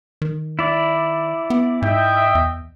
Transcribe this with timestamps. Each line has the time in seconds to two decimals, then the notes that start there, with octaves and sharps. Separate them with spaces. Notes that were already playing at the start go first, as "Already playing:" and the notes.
0.22 D#3
0.59 E4 D5
1.50 B3
1.82 G#2 D#5 E5 G5
2.35 E2